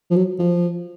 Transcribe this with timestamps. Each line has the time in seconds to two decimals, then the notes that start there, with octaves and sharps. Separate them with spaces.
0.11 F3
0.16 F#3
0.39 F3